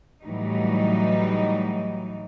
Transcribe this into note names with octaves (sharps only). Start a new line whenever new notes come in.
A2 E3 F#3 G3 D#4